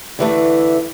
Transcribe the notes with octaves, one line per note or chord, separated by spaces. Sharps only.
D3 E3 A3